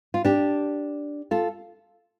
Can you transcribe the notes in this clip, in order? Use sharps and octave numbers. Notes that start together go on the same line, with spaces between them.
F4
D4 G4
F4 A4